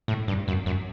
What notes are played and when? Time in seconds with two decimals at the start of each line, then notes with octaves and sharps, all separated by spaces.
0.08 A2
0.28 G2
0.48 F#2
0.66 F#2